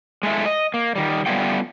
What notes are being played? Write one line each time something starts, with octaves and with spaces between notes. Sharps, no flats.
G#3 A3 E4
D#5
A#3
D#3 G3
G3 A3 B3 C#4 F4 G5